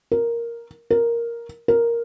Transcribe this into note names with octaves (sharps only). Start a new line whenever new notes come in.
A#4
A#4
A#4